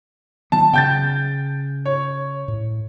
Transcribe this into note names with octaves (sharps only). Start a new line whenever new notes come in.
D#3 F#3 B3 A5
C#3 G5 G6 A6
C#5
A2